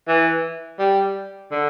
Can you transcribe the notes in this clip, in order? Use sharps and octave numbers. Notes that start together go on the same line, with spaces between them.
E3
G3
D3